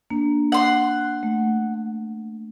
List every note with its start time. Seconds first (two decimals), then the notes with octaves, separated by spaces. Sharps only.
0.10 A#3 D4
0.52 F#5 C6
1.23 A3